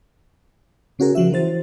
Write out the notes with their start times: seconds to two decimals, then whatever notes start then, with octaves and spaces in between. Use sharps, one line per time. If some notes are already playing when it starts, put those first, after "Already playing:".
0.99 C#3 C#4 F#4 G#4 A#4
1.15 C#3 F3 F#4 E5
1.33 E3 C5 A6